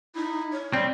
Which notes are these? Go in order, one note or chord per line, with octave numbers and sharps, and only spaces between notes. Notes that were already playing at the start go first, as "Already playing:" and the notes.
D#4 E4
C#5
G3 C4